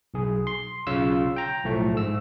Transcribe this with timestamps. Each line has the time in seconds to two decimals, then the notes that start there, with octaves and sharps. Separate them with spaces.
0.14 B1 G#4
0.47 C6
0.87 B1 C#3 F4 C#5 F5 E6
1.36 G5 A#5
1.64 B1 A2 F3 A3
1.95 G#2 E6